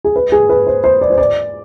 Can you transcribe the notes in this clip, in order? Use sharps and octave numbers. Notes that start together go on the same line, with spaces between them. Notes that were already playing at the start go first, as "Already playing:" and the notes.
G#4
B4
G#4
B4
C5
C5
D5
C5
D5